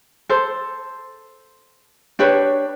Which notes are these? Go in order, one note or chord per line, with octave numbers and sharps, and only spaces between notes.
A4 C5
D4 G4 B4 C#5